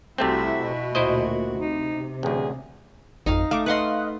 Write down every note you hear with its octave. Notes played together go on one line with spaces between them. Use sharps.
C2 C3 A3 C4 E4 F#4 E5
B2
D2 A#2 E4 F#4 C5 D#5
C3 D#4
A1 D2 G#4
G#1 F2 D#4 F5
A3 F5 D6
B4 D#5 F5 F#5 C6 F#6